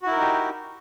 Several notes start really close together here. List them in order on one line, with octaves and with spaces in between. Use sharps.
F#4 E4 A#4 D#4 G4